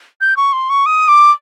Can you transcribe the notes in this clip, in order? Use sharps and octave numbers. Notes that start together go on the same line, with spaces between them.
G6
C#6
C6
C#6
D#6
D6